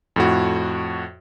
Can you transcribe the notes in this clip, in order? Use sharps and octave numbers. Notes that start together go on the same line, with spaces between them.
F2 A2 F#4